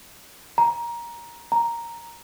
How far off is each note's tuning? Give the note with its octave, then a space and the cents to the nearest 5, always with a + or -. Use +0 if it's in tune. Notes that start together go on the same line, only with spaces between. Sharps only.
A#5 +15
A#5 +0